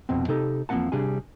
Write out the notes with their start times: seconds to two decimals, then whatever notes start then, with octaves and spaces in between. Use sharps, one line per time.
0.09 C2 F2 B2 C4
0.28 C3 D#4 G4 A4
0.69 E2 F3 A#3 C4 F#5 A5
0.92 C3 G3 D4 G#4 G#5